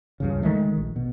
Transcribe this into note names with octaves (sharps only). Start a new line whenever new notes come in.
C#2 G2 C#3
D#3 E3 G#3 A3
A#1
B2